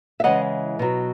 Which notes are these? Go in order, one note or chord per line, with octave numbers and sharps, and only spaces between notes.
E5
C#3 E3 G#3 D#5 F#5
B2 F#3